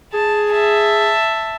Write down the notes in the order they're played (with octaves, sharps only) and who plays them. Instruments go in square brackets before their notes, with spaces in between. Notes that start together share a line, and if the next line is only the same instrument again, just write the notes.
[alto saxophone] G#4 [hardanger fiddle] A5
[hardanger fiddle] E5 A5